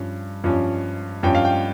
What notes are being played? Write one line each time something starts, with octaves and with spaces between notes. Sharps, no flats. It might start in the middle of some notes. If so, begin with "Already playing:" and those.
Already playing: G2 F3 C#4
G2 F3 C#4
G2 F3 C#4 G5
F5
G5